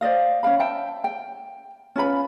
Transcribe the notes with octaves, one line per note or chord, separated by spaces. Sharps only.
C5 D5 D#5 F5
C#4 F#4 F5 B5
E5 G5 A5
G5
C#4 F4 B4 B5